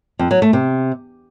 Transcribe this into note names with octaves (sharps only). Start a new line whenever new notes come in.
F2
F#3
A3
C3